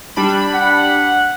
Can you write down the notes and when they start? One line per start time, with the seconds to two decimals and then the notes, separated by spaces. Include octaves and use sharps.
0.16 G3 D4 B5
0.54 F#5